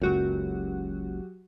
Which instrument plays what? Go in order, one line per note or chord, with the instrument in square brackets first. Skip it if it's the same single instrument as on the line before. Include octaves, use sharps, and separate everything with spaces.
[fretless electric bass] F#1 C#2 F#2 [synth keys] F#3 F#4 G4